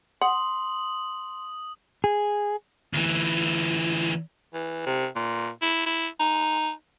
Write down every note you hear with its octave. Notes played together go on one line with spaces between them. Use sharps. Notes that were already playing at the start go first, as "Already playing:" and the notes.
F#5 C6 D#6 F#7
G#4
D2 E3
E3
C3
A#2
E4
E4
D#4